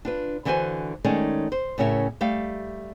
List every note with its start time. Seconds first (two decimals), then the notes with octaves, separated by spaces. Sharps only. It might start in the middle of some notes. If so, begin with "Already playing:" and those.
0.05 D4 F4 B4
0.45 D3 E3 E4 F#4 C5 G#5
1.04 D#3 G#3 A3 C#4 D#4 D5
1.52 C5
1.78 A2 C#3 C#4 A#4 E5
2.21 G3 A3 G4 F5